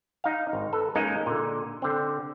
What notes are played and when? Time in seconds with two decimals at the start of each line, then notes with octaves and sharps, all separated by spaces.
0.24 D#4 F5
0.53 G#1
0.73 A4 B4
0.95 G#3 A#3 C#4 D#4
1.26 A#2 D3
1.82 D3 C4